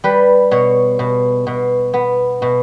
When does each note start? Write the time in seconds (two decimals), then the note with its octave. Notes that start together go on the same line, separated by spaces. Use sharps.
0.04 G3 B4
0.51 B2 C#5
0.99 B2
1.47 B2
1.94 B3
2.42 B2